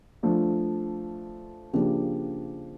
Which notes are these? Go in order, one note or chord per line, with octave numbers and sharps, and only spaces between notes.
F3 A3 D4
C#3 F3 A#3 D4 G4